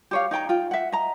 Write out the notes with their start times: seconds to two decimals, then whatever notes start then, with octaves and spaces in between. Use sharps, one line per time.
0.11 G4 C#5 F5
0.31 D#4 C#5 G5 A#5
0.49 F4 G5
0.71 E5 F#5
0.92 D#5 A#5